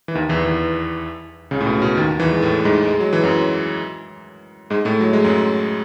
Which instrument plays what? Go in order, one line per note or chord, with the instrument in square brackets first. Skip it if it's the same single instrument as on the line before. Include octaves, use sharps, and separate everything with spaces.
[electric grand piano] E3
D#2 D#3
E2 E3
E2 E3
C#2 C#3
A2
B2
B2
D#2 D#3
E2 E3
G#3
A2 A3
G#2 G#3
G#3
F#3
E3
F#2 F#3
G#2 G#3
A2 A3
F#3
G#3
F#2 F#3